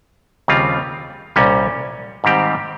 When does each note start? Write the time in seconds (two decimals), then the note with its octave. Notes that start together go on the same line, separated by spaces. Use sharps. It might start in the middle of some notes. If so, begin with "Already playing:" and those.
0.48 D#2 C#3 G3 C4 F4
1.36 C2 A#2 G3 C#4
2.24 G#2 D#3 G3 C4 G4